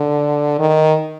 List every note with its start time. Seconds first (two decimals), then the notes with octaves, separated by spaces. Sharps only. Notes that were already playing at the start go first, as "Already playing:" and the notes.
Already playing: D3
0.59 D#3